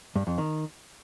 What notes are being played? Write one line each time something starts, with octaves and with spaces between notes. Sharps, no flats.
G2
F2
D#3